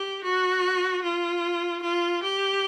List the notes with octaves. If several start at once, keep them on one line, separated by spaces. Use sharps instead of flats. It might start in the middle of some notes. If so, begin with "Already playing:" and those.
Already playing: G4
F#4
F4
F4
G4